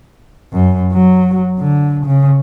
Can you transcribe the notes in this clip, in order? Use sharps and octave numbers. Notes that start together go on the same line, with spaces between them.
F#2
F#3
D3
C#3